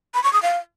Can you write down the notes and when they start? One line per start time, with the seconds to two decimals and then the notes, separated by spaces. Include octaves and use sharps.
0.14 B5
0.24 C#6
0.33 D#6
0.42 F5